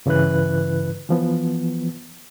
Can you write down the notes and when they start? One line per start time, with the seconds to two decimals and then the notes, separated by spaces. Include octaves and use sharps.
0.06 G2 C#3 E3 E4 B4 F#6
1.09 E3 F3 B3